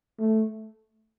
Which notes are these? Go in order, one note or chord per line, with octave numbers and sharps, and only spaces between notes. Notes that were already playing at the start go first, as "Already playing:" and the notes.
A3